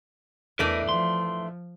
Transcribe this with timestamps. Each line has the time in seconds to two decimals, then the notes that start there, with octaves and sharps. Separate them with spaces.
0.59 E2 E3 A3 D4 A#4 B4 D#5
0.89 F3 C6